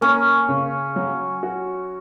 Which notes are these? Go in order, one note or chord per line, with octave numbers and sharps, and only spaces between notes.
A#3 C#4
C#3
F#3
F#4